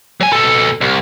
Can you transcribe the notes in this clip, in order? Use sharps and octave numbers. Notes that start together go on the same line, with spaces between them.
F#3 G#5
B2 A4
C2